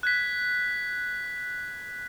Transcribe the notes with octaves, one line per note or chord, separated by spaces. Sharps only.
F#6 G#6 B6